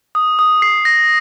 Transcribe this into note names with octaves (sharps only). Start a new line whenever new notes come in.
D#6
D#6
C7
A#6